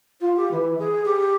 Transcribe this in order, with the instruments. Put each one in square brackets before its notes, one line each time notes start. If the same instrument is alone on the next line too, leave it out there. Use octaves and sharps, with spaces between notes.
[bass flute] F4
G4
E3
G#4
G4